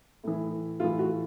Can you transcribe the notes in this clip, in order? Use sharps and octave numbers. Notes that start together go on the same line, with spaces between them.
A2 E3
A2 E3 F4
F#4